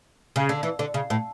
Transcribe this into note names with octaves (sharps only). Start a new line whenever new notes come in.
C#3
D3
E3
D3
C#3
A2